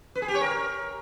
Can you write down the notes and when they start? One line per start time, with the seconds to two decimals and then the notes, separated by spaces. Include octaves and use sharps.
0.15 B4
0.22 G#4
0.28 G4
0.35 C#5
0.41 A#4